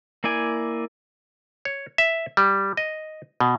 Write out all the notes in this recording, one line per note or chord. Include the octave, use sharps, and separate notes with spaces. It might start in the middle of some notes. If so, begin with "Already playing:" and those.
A#3 E4 D5 G#5
C#5
E5
G3
D#5
B2